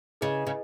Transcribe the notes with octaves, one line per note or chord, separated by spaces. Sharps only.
C#3 E4 G#4 B4 D#5 G#5
C#3